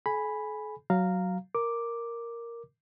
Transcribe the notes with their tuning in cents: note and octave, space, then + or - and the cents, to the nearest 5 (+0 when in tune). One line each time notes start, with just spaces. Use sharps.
A4 -45 G#5 +0 B5 +0
F#3 +5 F5 +0 A#5 -15
A#4 +0 D6 +0